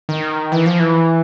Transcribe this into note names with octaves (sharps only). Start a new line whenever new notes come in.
D#3
E3
F3
E3